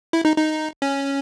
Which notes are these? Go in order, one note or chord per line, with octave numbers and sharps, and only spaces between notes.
E4
D#4
D#4
C#4